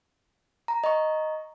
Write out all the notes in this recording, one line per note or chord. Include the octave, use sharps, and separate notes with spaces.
A#5
D#5 A#5 C#6